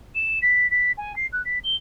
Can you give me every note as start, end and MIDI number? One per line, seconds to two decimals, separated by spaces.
0.15 0.39 100
0.42 0.69 95
0.70 0.91 95
0.97 1.15 80
1.16 1.26 96
1.32 1.42 90
1.45 1.58 95
1.63 1.75 103